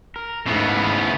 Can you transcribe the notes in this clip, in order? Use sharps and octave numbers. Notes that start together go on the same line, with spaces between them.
A#4
G#2 C#3 A3 B3 E4 C7